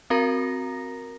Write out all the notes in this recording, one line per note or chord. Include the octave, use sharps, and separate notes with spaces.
C4 F#4 A#4 A#5 A#6